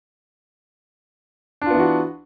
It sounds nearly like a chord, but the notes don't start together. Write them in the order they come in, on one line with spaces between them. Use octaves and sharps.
D4 F4 B3 E3 F#4